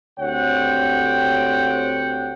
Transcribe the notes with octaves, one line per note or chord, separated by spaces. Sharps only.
D2 C4 G4 C#5 F#5 G5